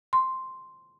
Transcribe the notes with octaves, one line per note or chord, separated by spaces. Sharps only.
C6